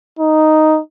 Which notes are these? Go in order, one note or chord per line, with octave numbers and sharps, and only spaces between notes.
D#4